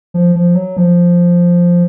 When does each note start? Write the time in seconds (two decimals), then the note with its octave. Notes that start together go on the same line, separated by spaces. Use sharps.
0.14 F3
0.35 F3
0.55 F#3
0.77 F3